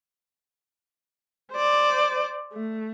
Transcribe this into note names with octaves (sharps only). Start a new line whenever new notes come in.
C5 D5
A3